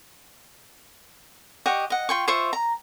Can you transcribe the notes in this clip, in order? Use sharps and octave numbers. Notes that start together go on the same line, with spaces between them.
G4 D#5 F#5 C#6
D#5 F#5
F4 G5 C#6
F4 C5 E5 C#6
A#5